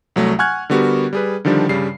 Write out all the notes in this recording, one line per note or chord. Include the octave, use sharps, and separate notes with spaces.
C2 F#3 A3
F#5 G#5 C#6 F6 F#6 G#6
D3 G3 B3 F#4 G4 A#4
G3 G#4 B4
D3 D#3 F3 G3 D4
G2 C#3 G3 C7